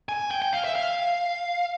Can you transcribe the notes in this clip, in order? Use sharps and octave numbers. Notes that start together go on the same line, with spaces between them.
G#5
G5
G5
F5
E5
F5